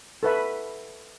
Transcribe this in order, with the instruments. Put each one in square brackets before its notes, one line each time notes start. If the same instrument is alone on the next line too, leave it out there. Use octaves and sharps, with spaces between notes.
[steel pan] A4 B4 E5